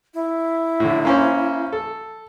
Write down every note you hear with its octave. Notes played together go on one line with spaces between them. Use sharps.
E4
A2 D3
A#3 C#4 C5
A4